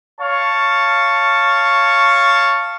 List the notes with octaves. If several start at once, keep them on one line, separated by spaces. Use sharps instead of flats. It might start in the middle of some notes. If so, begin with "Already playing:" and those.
C#5 F5 A5 C#6